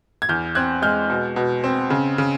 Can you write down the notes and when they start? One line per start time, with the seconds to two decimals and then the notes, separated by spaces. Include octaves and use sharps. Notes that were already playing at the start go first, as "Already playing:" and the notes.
0.22 G#6
0.29 E2 F6 G6
0.55 C4 F#6 G#6
0.82 G#3 F6 G6
1.10 B2
1.36 B2
1.64 C4
1.90 C#3
2.18 C#3